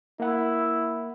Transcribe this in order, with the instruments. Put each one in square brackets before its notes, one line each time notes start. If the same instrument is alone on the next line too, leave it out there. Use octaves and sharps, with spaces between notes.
[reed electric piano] A#3 F#5 [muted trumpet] E4